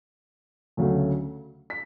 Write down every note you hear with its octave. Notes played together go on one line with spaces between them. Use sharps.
D2 C#3 F#3 A3
B6